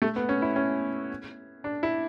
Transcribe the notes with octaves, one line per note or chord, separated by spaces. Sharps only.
A3
B3
C#4
E4
C#4
D4
E4